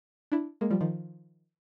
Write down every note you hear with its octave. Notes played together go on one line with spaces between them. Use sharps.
D4 E4
G#3 A#3
F3 G3
D#3 F3